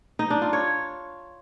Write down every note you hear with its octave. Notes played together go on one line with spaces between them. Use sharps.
D#4
D4
F4
C#5